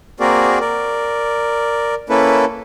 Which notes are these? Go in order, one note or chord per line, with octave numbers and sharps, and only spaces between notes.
A#3 C4 F#4 G#4 A#4 D5
A#4 D5
A#3 C#4 E4 A4 B4